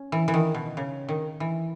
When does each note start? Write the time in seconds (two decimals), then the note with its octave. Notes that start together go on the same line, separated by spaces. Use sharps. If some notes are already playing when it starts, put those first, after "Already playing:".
Already playing: C#4
0.12 E3
0.28 E3
0.34 D#3
0.55 B2
0.77 C#3
1.09 D#3
1.40 E3